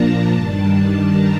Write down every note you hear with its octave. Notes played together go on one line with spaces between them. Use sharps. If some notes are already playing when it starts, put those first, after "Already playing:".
Already playing: A#2 F3 A#3 D4 A5 A#5
G2 D#3 G3 D4 A5
A#5